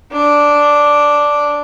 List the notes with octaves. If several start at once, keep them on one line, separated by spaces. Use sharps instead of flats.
D4